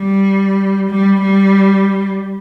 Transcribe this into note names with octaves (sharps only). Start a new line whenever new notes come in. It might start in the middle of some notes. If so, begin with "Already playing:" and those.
Already playing: G3
G3
G3